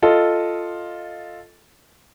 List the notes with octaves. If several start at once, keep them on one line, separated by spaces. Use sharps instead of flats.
F4 A4 D#5